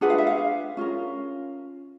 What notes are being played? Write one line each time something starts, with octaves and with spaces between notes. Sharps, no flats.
D4 F4 G#4 B4 F#5
F5
E5
F5
C#4 F4 A#4